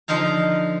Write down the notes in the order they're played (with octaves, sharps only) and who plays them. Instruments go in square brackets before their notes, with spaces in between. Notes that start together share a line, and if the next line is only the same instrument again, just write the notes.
[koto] D3 F3 D#4 F5 A#5